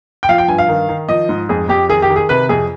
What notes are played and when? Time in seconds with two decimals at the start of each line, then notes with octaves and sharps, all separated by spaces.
0.23 G5
0.29 F3 F5
0.38 G5
0.48 G2 G#5
0.58 F5
0.68 D#3
0.89 D#3
1.09 F3 D#5
1.29 G#2
1.49 F2 G#4
1.69 F2 G4
1.89 D#3 G#4
2.02 G4
2.10 D#3
2.16 G#4
2.29 C3 B4
2.49 F2 G#4